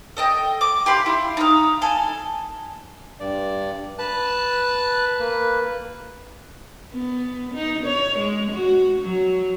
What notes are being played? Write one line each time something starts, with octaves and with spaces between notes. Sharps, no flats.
A4 D#5 G5
D6
G4 F5 B5 C6
E4
D#4 F5
A4 G#5
G2 D5
B4 A5 F#6
A#3 B4
B3
D#4
C#5
G#3
F#4
F#3